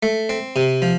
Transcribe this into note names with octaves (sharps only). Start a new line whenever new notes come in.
A3
C4
C3
F3